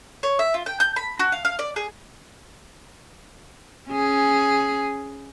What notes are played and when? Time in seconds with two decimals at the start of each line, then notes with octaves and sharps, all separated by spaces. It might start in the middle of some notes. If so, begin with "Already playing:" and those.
0.23 C#5
0.39 E5
0.54 F4
0.66 G5
0.80 G6
0.96 B5
1.19 F#4
1.32 F5
1.45 F5
1.59 D5
1.76 G#4
3.90 C#4 G#4